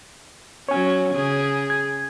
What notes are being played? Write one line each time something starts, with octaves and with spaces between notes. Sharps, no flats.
F#3 C#4 C#5 G#5
C#3 G#4
G#6